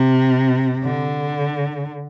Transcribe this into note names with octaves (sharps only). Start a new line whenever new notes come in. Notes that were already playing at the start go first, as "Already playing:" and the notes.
Already playing: C3
D3